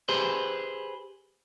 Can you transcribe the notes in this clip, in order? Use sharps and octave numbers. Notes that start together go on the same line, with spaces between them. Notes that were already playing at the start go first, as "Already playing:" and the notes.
G4 G#4 B4 C5